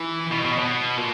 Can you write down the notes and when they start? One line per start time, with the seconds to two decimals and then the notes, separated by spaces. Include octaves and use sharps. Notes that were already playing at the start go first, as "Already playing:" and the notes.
Already playing: E3
0.31 B2
0.44 B2
0.58 B2
0.97 A#2